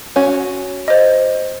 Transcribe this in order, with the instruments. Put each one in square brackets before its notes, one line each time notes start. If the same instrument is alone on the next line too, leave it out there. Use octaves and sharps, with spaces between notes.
[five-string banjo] C#4 F#4
[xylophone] C5 D#5